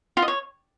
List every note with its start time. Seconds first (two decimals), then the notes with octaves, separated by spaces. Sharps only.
0.17 F4
0.22 D#5
0.28 C#5